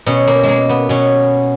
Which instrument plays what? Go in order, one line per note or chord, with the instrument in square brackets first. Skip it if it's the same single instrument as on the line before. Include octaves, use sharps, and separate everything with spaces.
[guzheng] B2 C#4
A#3
G#3
A#3
B3
B2 C#4